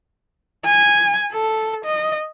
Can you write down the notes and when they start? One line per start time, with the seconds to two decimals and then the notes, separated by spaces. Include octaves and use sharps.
0.66 G#5
1.32 A4
1.85 D#5